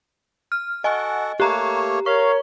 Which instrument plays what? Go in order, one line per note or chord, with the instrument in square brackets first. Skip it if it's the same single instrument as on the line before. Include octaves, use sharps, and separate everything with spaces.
[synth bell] F6
[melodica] F#4 A4 F#5 [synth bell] D#5 G#5
[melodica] A3 A#3 C#5 [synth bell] G4 A#5
[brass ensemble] A#4 C#5 [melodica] F5 [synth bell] C#6